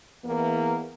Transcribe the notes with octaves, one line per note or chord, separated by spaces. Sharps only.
E2 E3 A#3 B3